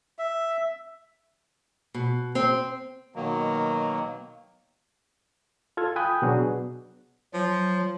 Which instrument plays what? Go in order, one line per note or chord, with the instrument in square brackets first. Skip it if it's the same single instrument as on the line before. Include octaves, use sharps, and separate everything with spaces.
[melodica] E5
[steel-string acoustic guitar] B2
C4
[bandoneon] B2 D#3 F#3 A#3
[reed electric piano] F4 A4 F5 G#6
G5 G#5 B5 D#6 F#6 G6
B2 F#3 B3 D4 F#4 G#4
[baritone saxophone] F3 [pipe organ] F#3